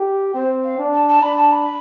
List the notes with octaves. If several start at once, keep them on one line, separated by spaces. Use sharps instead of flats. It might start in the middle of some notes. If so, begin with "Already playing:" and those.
Already playing: G4
C4 C5
F5
D4
A5
A5
D4 B5
A5
B5